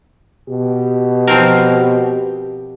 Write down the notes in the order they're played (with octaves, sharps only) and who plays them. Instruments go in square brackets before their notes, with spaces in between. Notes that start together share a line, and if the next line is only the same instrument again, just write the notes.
[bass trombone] B2 [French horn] G4
[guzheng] F3 C4 A#4